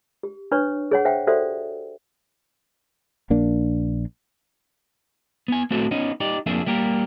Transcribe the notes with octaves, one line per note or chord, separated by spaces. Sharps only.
G4
D4 B4 C#5 C#6
G#4 C#5 F#5
C5 E5 F#5 G5
F#4 G4 A4 C5 D5 E5
A#1 A#3 D4
B3 G#5
A3 B3 C4 E4 F#4 A4
B3 C#4 D#4
D#4 G4 D5
F2 A#3 D4 G#4 E5
G3 A#3 G4 A#4